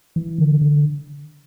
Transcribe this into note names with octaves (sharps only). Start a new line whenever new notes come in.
E3
D3
D3